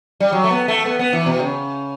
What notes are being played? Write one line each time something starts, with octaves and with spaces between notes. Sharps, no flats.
G3
F#3
A3
B3
A3
B3
B3
E3
B2
C#3